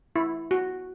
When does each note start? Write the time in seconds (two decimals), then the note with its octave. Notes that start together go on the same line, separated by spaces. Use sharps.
0.16 E4
0.51 F#4